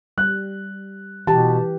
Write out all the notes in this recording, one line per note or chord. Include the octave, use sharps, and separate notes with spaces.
G3 F#6
B2 E3 G4 A5